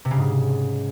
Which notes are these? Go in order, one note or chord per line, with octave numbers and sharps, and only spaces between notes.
C3
C#3
G#2